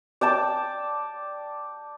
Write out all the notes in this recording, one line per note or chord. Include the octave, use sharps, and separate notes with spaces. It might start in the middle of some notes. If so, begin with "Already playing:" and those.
D5 G5 A5 D6